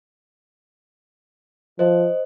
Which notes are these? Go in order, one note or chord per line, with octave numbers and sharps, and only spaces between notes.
F3 C5 D#5